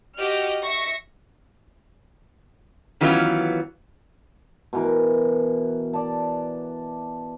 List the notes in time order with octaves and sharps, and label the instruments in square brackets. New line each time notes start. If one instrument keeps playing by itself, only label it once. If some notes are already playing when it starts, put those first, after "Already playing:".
[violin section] F#4 G4 D#5 F6
E5 C#6 A#6
[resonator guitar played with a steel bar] D#3 E3 F#3 B3 C#4 F4
[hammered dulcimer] B2 E3 A#4
D5 A5